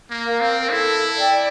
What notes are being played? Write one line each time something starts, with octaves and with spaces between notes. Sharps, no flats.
A#3
A#4 F5
C4
E4 A4
D5 G5